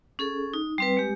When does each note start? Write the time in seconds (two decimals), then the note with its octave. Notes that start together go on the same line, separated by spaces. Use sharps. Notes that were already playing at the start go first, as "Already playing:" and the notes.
0.19 C#4 G#4 A4
0.54 D#4
0.78 G3 C4 B4
0.97 G#3 G4